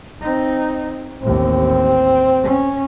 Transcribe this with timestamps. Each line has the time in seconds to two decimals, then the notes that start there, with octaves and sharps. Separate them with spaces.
0.22 C4 D#4
1.22 A1 D#2 C4
2.43 C#4